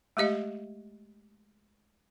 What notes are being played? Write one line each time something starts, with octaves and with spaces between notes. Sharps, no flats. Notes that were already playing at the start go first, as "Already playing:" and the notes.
G#3 A3 G4 D#5 F5